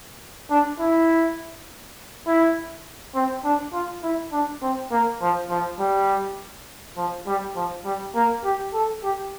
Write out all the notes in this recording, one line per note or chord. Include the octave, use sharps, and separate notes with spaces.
D4
E4
E4
C4
D4
F4
E4
D4
C4
A#3
F3
F3
G3
F3
G3
F3
G3
A#3
G4
A4
G4